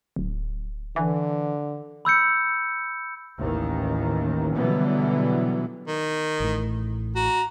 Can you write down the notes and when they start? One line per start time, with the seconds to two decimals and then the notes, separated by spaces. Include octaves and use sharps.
0.16 D1
0.96 D3 E3
2.05 B5 E6 G6 C#7
3.38 A1 D#2 D#3
4.54 B2 D3 E3 F#3 G3 B3
5.87 D#3
6.40 A1 A2
7.16 F#4 A#5